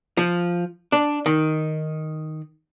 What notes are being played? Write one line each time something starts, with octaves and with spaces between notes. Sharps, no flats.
F3
D4
D#3